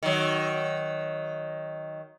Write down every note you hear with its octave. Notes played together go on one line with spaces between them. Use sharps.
D#3 F#3